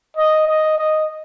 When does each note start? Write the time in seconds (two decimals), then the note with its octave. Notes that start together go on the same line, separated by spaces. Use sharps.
0.16 D#5
0.47 D#5
0.78 D#5